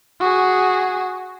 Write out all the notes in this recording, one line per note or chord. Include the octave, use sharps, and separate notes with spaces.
F#4 G#4